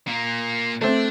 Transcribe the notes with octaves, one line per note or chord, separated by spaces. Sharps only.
A#2 A#3
A3 C4 D4